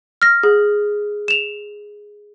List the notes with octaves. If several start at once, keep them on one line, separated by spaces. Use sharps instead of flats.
F6 A#6
G#4
E7 F7